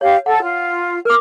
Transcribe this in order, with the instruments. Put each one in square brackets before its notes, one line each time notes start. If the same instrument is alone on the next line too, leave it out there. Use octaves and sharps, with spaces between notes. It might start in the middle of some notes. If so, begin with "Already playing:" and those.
[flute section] G4 F5 [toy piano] C#5
[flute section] A4 [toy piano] F#5
[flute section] F4
[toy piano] A#4 D6 [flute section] F6